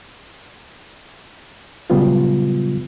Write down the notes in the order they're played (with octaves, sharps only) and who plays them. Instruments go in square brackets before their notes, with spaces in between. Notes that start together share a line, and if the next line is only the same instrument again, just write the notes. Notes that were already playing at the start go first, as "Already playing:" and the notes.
[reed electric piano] A#2 C#3 F#3 G3 B3 F4